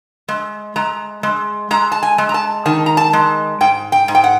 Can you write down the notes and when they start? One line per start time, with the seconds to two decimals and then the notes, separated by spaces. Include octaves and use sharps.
0.28 G#3
0.76 G#3 A#5
1.23 G#3
1.71 G#3 A#5
1.92 A5
2.03 G#5
2.18 G#3
2.29 A#5
2.34 A5
2.66 D#3 A5
2.86 A#5
2.97 A5
3.13 G#3
3.61 G#2 G5
3.92 G5
4.08 G#2
4.15 G5
4.24 F#5